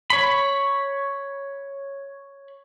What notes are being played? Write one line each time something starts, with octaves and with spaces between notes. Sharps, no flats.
C#5 B5